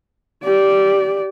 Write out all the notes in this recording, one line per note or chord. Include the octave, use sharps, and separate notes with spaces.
G4 D5